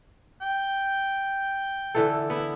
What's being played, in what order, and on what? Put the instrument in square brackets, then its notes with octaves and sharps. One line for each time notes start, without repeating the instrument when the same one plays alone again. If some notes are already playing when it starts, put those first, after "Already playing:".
[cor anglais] G5
[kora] D3 E3 A4
[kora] B3 [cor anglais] E4